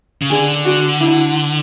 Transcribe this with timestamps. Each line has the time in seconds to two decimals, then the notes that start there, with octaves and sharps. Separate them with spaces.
0.22 C#3
0.30 D3 G#4
0.65 F#4
1.01 E4